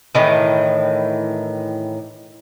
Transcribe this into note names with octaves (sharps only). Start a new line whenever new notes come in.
A2 D#3 E3